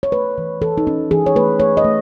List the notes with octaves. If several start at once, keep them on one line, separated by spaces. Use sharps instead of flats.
C#5
A3 B4
E3
E3 A4
D#4
E3 C#4
E3 G#4
C#5
A3 B4
A3 C#5
D#5
A3